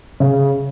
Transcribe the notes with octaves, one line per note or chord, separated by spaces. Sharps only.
C#3